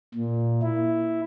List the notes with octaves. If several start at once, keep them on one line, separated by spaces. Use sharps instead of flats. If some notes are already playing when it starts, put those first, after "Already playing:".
A#2
E4